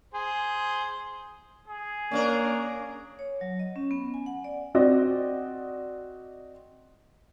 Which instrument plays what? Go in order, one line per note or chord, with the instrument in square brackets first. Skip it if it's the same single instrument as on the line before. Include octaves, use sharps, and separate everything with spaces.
[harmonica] G#4 C5
[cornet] G#4
[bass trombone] A#3 [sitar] C#4 D4 A#4
[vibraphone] C#5
F#3
D#5
C#4
B3
G#5
F#5
D5
[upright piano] C4 F#4 D5 D#5